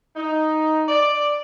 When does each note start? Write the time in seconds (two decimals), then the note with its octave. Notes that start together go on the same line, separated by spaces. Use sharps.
0.16 D#4
0.88 D5